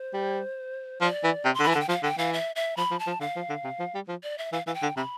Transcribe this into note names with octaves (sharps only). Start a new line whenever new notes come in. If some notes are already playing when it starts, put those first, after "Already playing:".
Already playing: C5
G3
F3 D5
E3
C3
C6
D3
B5
E3
D3 A5
G5
F3 F5
D3 G5
E3 F5
E5
E5
F3 B5
F3
A5
F3
D3 F5
F3
D3
C3
F3
G3
F3
D5
E5
E3 F5
E3 F5
G5
D3
C3 B5